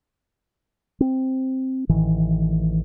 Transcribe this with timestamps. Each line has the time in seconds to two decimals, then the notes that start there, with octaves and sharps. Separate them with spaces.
1.00 C4
1.89 A1 D#3 E3